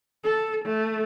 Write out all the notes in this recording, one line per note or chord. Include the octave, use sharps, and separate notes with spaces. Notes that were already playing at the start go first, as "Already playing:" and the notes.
A4
A3